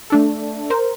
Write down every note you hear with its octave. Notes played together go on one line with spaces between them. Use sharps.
A3 D4 A4
A#4 C5